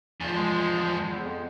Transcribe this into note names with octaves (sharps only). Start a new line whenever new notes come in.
E2 F3
G#3
E2
F2